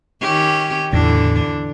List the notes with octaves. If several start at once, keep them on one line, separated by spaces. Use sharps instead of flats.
D#3 C#4 G4
E2 A2 D3 E3 D4